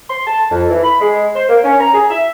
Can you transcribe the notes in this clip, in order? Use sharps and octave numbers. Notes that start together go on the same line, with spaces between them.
C6
A5
F2
E3
B5
G#3
C5
A#3
C#4
A#5
G#4
E5